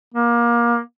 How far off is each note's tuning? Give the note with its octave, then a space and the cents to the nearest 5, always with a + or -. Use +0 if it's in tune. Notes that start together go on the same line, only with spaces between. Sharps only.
A#3 +25